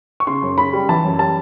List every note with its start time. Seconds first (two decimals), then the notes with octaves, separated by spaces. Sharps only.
0.20 C#6
0.27 C#3 C6
0.42 F#2
0.58 C#3 B5
0.73 G3
0.89 E3 A5
1.04 F#2
1.19 G3 A5